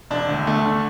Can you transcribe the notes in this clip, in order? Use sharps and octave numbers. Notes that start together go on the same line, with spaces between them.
E1 D4
D2
A3
D3